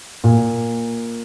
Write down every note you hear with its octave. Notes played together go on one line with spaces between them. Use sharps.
A#2